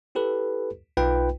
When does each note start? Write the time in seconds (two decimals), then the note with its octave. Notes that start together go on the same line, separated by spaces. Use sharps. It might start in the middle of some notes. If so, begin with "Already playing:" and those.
0.15 E4 G4 A4 B4
0.97 B1 D#4 F4 B4 G5